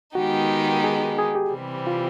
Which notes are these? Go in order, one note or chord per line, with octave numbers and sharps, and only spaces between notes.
D#3 G#3 B3 D#4 F#4 G4
G#4
G#4
G4
C3 E3 G3 C4
F4